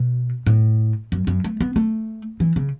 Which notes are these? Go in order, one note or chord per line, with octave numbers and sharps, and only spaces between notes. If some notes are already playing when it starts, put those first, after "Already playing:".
Already playing: B2
A2
F#2
F#2
A3
B3
A3
E3
C#3